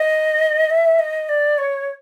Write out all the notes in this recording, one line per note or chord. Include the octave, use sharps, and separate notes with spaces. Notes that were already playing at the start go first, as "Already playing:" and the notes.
Already playing: D#5
E5
D#5
D5
C#5